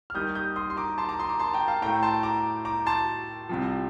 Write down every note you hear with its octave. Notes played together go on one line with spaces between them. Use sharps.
F6
D#2 D#3 G3 D#6 G6
D#6 G6
C6 D#6
C6
A#5 D6
A5 C6
A#5 D6
C6 D#6
A#5 D6
A5 C6
G5 A#5
F5 A5
A2 A3 G5 A#5
A5 C6
A#5 D6
A#5 D6
A5 C6
C2 C3 F3